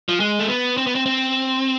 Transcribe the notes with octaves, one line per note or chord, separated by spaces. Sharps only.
F3
G#3
A3
B3
C4
B3
C4
C4